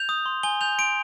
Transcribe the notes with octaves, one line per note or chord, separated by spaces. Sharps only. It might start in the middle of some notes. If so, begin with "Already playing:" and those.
Already playing: G6 F7
D#6
C6
G#5 G7
G6 F7
C6 D7